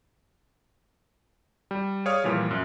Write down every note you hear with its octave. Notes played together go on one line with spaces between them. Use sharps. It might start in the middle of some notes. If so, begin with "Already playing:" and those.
G3
G#4 C#5 D5 F5 D#6 F6
A#2 E3 F3 G3
F#2